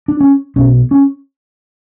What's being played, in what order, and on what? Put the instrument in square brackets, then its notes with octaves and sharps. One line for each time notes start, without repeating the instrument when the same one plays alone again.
[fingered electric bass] D4
C#4
B1 B2 C#4
C#4